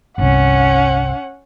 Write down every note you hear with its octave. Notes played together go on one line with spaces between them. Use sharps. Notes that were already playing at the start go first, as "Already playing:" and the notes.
G1 C2 C#4 F#5